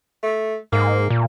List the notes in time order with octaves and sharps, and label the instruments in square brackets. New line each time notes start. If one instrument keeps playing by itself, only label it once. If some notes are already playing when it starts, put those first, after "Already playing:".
[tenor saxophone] A3
[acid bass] G#2 [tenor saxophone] A#3
[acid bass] A#2